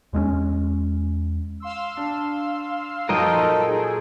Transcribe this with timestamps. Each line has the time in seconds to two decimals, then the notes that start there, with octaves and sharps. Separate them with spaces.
0.13 E2 G#3 A#3 C#4
1.60 F5 C6 E6
1.97 D4
3.09 A#2 F3 F#3 D#4 A4 A#4 D#5 G5
3.65 G#4